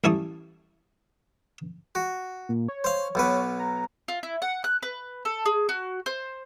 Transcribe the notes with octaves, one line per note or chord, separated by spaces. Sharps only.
A1 G3 E4 A5 C#6 D#6
F#4
A#2
C#5
C5 F5
B1 B2 B4
A#5
F4
E4
F#5
F#6
B4
A4
G#4
F#4
C5